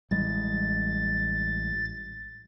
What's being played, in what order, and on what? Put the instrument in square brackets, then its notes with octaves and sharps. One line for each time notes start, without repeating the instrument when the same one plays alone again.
[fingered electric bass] A1 G3 G#3 [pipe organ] A6